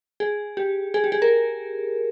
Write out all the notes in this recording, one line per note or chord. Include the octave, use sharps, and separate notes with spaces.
G#4
G4
G#4
G4
G#4
A#4